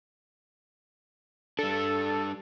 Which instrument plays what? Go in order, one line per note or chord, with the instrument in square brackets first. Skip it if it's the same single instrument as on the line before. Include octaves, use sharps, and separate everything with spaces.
[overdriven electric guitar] G3 D4 [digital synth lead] A4